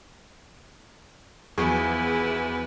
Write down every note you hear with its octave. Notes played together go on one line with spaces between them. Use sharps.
E2 F3 F#3 E4 G#4 B4